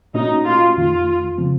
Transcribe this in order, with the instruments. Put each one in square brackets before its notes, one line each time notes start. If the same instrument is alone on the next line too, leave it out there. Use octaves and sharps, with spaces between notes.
[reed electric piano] A#2 A3 C#4 F#4 [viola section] D#4
[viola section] F4
[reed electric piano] F2 D#3 A3 [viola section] F4
[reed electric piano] C#3 F3 C4